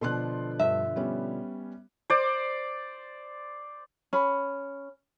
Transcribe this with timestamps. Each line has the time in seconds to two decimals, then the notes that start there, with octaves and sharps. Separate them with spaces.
0.01 B2 D3 F3 A4 C6 F#6
0.59 G2 E5
0.96 G3 B3 C#4
2.10 C5 D5
4.13 C#4 B5